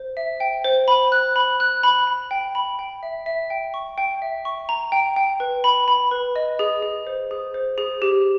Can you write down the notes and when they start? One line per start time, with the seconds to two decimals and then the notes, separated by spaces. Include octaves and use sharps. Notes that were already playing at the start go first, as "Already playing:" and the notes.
Already playing: C5
0.17 E5
0.40 G5
0.64 C5
0.88 B5
1.12 F#6
1.36 B5
1.60 F#6
1.83 B5
2.07 B5
2.31 G5
2.55 B5
2.79 G5
3.03 E5
3.26 E5
3.50 G5
3.74 C#6
3.98 G5
4.22 E5
4.45 C#6
4.69 A#5
4.92 G5
5.16 G5
5.40 B4
5.64 B5
5.88 B5
6.11 B4
6.36 D#5
6.59 G#4
6.83 G#4
7.07 C5
7.31 G#4
7.54 C5
7.78 G#4
8.02 G4